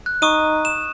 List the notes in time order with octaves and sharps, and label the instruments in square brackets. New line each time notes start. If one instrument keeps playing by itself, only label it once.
[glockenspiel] F#6
[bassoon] D#4 [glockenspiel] C#6 D#6 D#7
[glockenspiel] E7